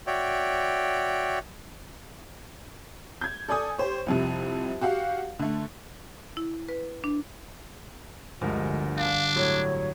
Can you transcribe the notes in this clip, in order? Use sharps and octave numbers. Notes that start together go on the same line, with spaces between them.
F#4 C#5 D5 E5 G5
G6 G#6
A4 D5 G#5 D#6
G4 C5 C#5
C2 F2 C3
F#4 G4 F5 F#5
D3 A3
E4
B4
D4
G1 D2 F3 G#3 A#4
D4 F5
A2 F#3 C#5